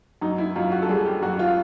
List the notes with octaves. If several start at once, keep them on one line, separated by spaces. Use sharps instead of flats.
F#2 D#4
E4
F#2 F4
F#4
A4
G3 G#4
G4
F#2 F#4
F4